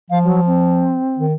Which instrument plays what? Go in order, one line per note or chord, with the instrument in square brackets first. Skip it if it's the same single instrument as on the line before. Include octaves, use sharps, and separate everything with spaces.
[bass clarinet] F3 [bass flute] F5
[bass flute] F#3
C4
[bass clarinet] D#3